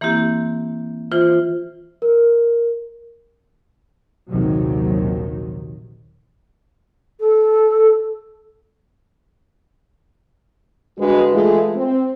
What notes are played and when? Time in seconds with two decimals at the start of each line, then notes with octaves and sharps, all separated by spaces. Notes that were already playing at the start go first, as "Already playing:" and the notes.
0.01 E3 A#3 C4 E4 G4
1.11 E3 F4 C5
2.02 A#4
4.28 A#1 D#2 C3 D#3 F#3
7.20 A4
10.98 D2 G2 G#3 D4 F#4 B4
11.32 E3 G#3 A3 E4 F4 G#4
11.76 C4